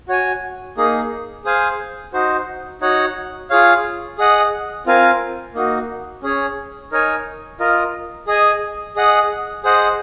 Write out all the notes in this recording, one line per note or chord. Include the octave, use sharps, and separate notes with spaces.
F#4 C#5 G#5
A#3 D#4 G#4
G#4 C5 F5 G#5
D#4 F#4 C5
D#4 F#4 C#5 F#5
F4 G#4 C#5 F5
G#4 D#5 F#5
C4 F4 A#4 F5 G#5
A#3 D#4 F#4
C#4 G#4 C#5
D#4 A#4 C#5 G#5
F4 A#4 D#5
G#4 D#5 G#5
G#4 D#5 F#5
G#4 C5 D#5 F#5